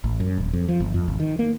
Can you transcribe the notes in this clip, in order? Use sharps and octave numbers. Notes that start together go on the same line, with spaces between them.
A1
F#2
D#1
F2
F3
G1
F2
G#1
D#3
A#3